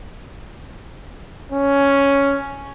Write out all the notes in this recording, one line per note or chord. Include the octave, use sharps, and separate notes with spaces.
C#4